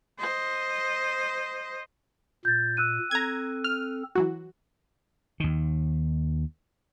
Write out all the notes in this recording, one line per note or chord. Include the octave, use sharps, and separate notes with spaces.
C5 D#5
A#2 G6 A6
E6 F#6 D#7
C4 A4 A#5 G#6
F6
E3 F#3 F#4
D#2 D#3